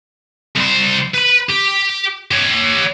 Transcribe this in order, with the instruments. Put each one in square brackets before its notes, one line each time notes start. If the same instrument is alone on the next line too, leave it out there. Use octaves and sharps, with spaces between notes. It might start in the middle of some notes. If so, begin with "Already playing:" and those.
[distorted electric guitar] C2 C5
B4 B5
G4
G4 C#5